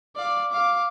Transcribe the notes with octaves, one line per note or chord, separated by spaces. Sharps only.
D5 F5
F5 D6